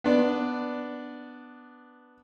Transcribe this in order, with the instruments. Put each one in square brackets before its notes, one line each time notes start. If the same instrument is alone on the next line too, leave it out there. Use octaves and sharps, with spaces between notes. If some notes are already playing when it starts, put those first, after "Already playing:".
[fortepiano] B3 D4 D5